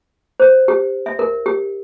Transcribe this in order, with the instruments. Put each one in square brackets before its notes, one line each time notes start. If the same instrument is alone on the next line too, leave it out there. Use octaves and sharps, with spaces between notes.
[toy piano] C5
G4
E5
A#4
G4